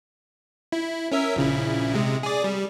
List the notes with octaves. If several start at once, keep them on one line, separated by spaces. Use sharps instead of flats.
E4
C#4 A#4 E5
A#1 C#3 E4
C3 G#3
G#4 D5
G3